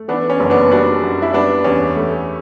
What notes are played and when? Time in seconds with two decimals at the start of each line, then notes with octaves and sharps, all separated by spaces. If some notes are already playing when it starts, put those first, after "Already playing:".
Already playing: A3
0.08 E3 B3 D4
0.30 C#4
0.40 F#1
0.50 B3 D4
0.71 G3 D4 F#4
1.03 F#2
1.22 E4
1.34 G3 B3 D4
1.64 E2 C#4
1.96 A3